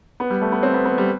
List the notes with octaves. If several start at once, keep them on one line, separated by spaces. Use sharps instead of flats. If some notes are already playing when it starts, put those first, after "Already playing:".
B3
G3
A3
B3
C4
B3
B3
G3